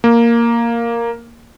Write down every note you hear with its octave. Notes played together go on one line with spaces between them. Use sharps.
A#3